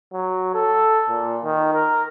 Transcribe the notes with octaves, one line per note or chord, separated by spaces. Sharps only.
F#3
A4
A#2
D#3
A#4